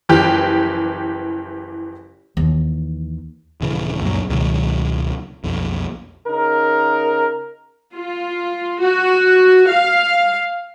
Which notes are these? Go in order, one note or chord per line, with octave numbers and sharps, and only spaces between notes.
F#1 E3 F3 G4 G5
D#2 E3
D#1 C#3 E3
C#2 F#2 A#2 F#3
C#2 B2 D#3 F#3
B1 F2
C#3 D#4 A#4
F4
F#4
F5